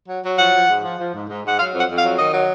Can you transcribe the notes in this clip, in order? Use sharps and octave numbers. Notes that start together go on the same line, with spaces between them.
F#3
F#3
F3 F#5
F3
G#2
F3
F3
G#2
G#2
G#2 F#5
F#3 F5
F2
F#5
F2
F5
F#3
D#3 D#5
F#3